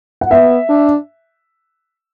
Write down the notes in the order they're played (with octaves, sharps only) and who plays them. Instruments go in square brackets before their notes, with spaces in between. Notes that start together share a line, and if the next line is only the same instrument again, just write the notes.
[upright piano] F#5
[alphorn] B3 [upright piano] E5
[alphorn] D4